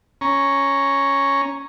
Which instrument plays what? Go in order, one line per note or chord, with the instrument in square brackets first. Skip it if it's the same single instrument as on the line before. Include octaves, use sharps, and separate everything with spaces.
[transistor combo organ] C#4 A#5 C#6